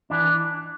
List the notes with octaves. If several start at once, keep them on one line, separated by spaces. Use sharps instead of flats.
E3 D4